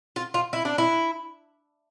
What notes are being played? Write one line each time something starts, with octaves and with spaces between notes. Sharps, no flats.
F4
F4
E4
D4
E4